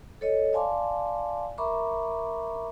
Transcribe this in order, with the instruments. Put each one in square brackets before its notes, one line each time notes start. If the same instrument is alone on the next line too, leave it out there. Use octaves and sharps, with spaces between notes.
[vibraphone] A4 C#5 D#5
D5 F5 G#5 A5 C6 D6
A#4 E5 A#5 B5 C#6 D6